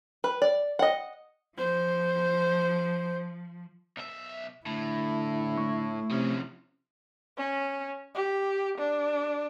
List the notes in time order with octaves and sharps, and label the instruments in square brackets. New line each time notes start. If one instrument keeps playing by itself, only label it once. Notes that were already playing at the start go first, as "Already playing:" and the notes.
[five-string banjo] B4
D5
D#5 F#5
[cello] F3 [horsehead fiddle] C5
[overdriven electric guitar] B1 E5
[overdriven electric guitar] A2 [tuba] D3 [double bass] E4
[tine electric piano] A3 C#6
[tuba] C3 [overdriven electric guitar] F3 C#4
[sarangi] C#4
G4
D4